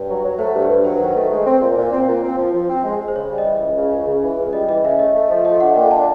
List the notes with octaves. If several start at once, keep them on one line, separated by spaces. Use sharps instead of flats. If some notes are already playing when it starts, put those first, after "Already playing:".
Already playing: G2 C#5
F#3
F#3
A3 C5
G2
B4
G2
F#3 C5
D#3
B4
A3
G#3
C4
A#2
A#2
C4
A#2
C4
F3
F3
C4
G#3
G#3
C5
C#3 C#5
G3
D#5
E3
C#2
C#3
C#2
C#3
E3
C#2
G3 D#5
E3 D#5
C#3 E5
A3 D#5
A3
F3
A3 D#5
D4 F#5
A#2 G5
D4 A5